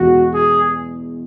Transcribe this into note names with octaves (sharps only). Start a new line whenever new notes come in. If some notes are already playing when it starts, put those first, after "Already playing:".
Already playing: E2 B2 G#3 F#4
G#4